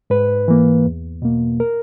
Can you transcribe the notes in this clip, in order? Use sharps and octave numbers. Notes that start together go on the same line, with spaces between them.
G#2 B4
E3 A#3
E2
B2 A#3
A#4